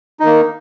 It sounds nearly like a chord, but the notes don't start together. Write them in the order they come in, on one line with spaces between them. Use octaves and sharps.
D#4 D#3 A#3